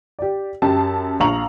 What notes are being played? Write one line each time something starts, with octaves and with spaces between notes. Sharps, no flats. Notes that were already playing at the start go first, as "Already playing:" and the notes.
G4 D5
F#2 G4 A5
A#1 F5 A#5 C#6 F7 F#7